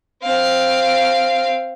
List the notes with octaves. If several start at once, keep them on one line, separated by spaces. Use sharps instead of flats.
C4 F5